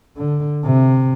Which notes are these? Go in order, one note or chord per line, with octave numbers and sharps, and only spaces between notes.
D3
C3